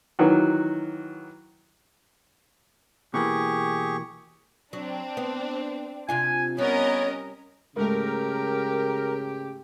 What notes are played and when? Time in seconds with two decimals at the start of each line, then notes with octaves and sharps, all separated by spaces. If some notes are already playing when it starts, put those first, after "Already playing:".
0.19 D#3 E3 F#3 F#4
3.14 B2 E3 A#3 G4 G#4 C#6
4.73 F#3 C4 D4
5.17 B3
6.09 C3 D4 F4 G#5
6.58 G3 B3 C#4 A#4 C#5 D#5
7.76 G#2 C#3 A3 G4 A#4